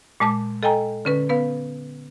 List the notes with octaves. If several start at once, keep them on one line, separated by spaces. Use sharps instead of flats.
A#2 G#3 A5 D6
A4 D#5 G5 G#5 A#5
D3 C#4 B4
B3 B4 F5